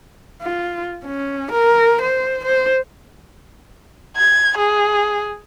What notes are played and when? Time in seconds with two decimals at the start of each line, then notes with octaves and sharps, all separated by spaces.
0.42 F4
1.05 C#4
1.51 A#4
2.02 C5
2.45 C5
4.17 G#6
4.58 G#4